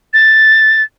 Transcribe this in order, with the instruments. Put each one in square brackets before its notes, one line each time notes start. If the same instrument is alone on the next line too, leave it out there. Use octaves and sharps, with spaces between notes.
[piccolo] A6